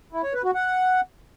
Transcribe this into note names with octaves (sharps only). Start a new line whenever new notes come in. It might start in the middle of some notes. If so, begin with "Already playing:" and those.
E4
C#5
B4
F#4
F#5